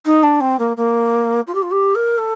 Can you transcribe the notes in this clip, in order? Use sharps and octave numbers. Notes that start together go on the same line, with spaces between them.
D#4
D4
C4
A#3
A#3
F4
G4
F4
G4
A#4
A4